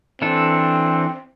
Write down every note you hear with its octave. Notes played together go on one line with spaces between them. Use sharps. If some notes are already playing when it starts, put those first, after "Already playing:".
E3 C4 D4 A4